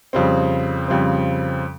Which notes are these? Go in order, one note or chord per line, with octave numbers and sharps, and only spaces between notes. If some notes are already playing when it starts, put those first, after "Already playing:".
F2 C#3 G3 C4
F2 C#3 G3 C4